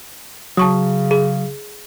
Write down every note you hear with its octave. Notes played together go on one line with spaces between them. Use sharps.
C#3 F#3 A5 C#6 D#6
G#4